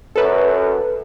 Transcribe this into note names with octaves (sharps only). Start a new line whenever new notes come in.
F#2 A4 B4